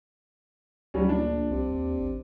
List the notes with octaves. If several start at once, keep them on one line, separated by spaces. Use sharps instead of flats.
D2 F#3 G3 C#4
A#1 D4
C2 C3
D#2
A1